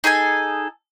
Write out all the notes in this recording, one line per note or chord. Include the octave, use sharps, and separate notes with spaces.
D#4 G#4 A4 G#5